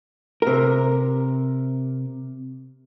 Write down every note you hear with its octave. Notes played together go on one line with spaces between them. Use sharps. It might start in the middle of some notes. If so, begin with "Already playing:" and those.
C3 A#4